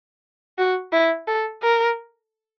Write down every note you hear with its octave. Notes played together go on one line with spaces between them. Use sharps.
F#4
E4
A4
A#4